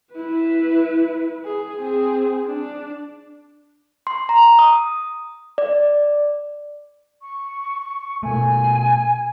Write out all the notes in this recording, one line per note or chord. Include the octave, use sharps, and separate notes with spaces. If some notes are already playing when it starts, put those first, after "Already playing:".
E4 B4
G#4
C4 G#4
D4
C6
A#5
D#6
D5
C#6
B2 A3 G#5